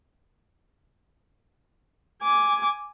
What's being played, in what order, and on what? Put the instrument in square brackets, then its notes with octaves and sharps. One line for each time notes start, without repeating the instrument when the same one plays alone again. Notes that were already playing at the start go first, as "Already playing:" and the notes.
[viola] G#5 D6